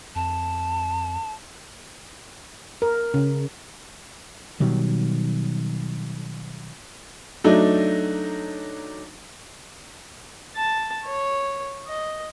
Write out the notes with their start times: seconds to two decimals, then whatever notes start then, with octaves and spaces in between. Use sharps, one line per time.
0.15 F2 A5
2.82 A#4
3.14 C#3
4.60 B2 D#3 F#3 G3
7.44 F#3 A3 D4 D#4
10.57 A5
11.05 C#5
11.87 D#5